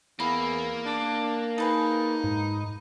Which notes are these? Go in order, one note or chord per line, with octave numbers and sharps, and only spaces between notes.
E2 A#3 B5
D4
D#4 G#4 B4 A5
G#2